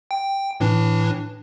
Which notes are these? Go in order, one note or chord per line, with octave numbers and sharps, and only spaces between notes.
G5
A2 E3 D4